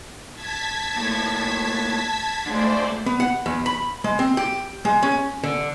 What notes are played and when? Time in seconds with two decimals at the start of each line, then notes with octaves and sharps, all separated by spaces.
0.34 A5 G#6 B6
0.96 A#2 A3
2.46 D3 G#3 A3 C5 D5
3.06 B3
3.20 F#5
3.46 E2
3.66 B5
4.04 G#3
4.19 C4
4.37 G4
4.85 G#3
5.03 C#4
5.44 D3